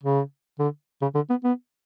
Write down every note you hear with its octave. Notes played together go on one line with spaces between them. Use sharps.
C#3
D3
C#3
D3
B3
B3